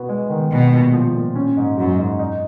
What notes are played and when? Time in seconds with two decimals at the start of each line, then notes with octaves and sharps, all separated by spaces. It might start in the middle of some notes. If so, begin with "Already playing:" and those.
Already playing: B2 B3 F#4
0.09 G#3
0.30 D#3
0.50 B2 G#3
0.73 A#2
0.93 F3
1.14 A#2
1.35 C#4
1.57 G#2
1.77 F#2 F#3
1.98 G#2
2.19 D#4